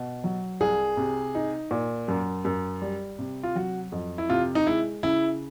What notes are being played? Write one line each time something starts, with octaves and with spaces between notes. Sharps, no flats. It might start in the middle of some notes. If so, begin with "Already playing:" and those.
Already playing: B2
F#3
C2 G#4
C3
D#4
A#2
F#2
F#2
G3
C3
F4
F#3 F#4
F2
E4
C3 F4
D#4
G#3 E4
C#3 E4